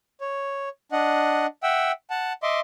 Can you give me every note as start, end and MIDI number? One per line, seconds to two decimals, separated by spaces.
0.21 0.69 73
0.92 1.46 62
0.92 1.46 75
0.92 1.46 78
1.63 1.92 76
1.63 1.92 78
1.63 1.92 79
1.63 1.92 88
2.10 2.33 78
2.10 2.33 81
2.43 2.60 75
2.43 2.60 76
2.43 2.60 84
2.43 2.60 86